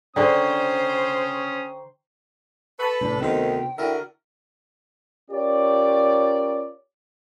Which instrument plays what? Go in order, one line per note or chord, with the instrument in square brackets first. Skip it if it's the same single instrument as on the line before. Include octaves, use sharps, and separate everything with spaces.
[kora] D3 G#4 [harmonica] C#4 D#6 [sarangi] C5 [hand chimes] G5 A#5 C#6
[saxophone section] A4 B4 [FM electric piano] A5 B5 C#6
[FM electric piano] C2 A2 [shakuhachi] D4
[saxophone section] D2 D#3 [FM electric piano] C3 B3 C5 [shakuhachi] G5
[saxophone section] D3 F#4 A#4 [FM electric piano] D4 E4 E5
[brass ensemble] C#4 F4 G4 A#4 C#5 D5